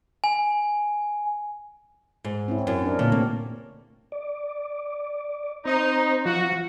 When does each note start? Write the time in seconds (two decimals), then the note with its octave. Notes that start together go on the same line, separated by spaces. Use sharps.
0.24 G#5
2.24 G#2
2.48 C4 C#4 E4
2.67 F#2
2.82 C#4 D4 A#4
2.99 A#2 D3 C#4
3.12 C3 A3 A#3 C4
4.12 D5
5.65 C4 D#4 C5
6.25 F3 F4 F#4